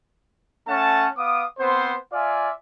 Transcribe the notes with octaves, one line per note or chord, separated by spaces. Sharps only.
A3 C#4 F#5 A5
B3 F5 D6 D#6
B3 C4 C5
F4 D5 E5 F5 G#5